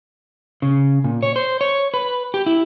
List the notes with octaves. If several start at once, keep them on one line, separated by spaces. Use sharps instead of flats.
C#3
A#2
C#5
C5
C#5
B4
G4
E4